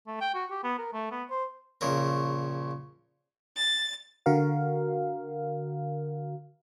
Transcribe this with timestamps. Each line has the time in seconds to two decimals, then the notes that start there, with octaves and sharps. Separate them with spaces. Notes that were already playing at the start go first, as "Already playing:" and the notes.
0.07 A3
0.21 G5
0.35 F#4
0.51 G4
0.64 B3
0.79 A#4
0.93 A3
1.11 B3
1.30 C5
1.81 A#1 C#3 A#4
3.56 A6
4.26 D3 F#4 A#4 F5